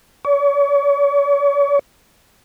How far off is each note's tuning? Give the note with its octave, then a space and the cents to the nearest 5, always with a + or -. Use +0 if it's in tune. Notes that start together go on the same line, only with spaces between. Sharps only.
C#5 +40